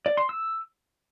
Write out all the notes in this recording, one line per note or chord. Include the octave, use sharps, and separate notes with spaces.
D5
C6
E6